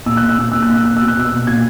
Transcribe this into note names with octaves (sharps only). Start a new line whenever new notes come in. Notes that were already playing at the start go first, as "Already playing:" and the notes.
A#2 E6
F#6
A#2
E6
A#2 F#6
A#2 E6
F#6
A#2
E6
A#2 F#6
B2 E6
F#6
B2 E6
B2
A#2 G#6